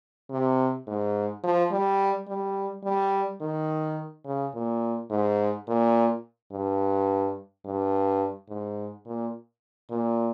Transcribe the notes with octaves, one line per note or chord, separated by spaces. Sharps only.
C3
G#2
F3
G3
G3
G3
D#3
C#3
A#2
G#2
A#2
G2
G2
G#2
A#2
A#2